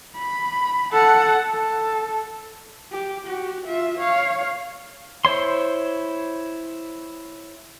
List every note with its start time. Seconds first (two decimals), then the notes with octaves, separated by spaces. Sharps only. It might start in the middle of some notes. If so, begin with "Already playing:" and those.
0.16 B5
0.92 A4 F#5
1.53 A4
2.92 G4
3.26 F#4 G4
3.66 F4 E5
3.99 C#5 F5
5.25 E4 C5 C#5 C6